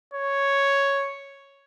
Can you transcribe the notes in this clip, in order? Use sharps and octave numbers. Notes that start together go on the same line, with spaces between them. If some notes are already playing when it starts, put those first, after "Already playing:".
C#5